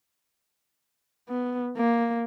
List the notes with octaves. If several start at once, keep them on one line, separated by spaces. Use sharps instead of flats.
B3
A#3